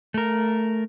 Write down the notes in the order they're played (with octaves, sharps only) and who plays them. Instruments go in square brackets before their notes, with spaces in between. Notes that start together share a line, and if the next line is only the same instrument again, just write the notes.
[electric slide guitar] A3 A#4